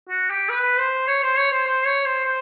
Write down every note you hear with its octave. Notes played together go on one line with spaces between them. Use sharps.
F#4
G4
B4
C5
C#5
C5
C#5
C5
C5
C#5
C5
C5